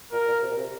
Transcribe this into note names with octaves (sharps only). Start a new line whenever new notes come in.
A#2 A#4
A#2
C3
A#2
C3